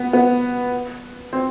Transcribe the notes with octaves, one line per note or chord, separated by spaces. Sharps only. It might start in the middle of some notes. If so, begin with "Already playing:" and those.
Already playing: B3
B3
C4